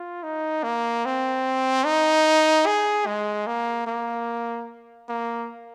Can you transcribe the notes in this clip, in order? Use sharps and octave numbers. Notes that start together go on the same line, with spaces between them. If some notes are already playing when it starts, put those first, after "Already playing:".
Already playing: F4
D#4
A#3
C4
D#4
G#4
G#3
A#3
A#3
A#3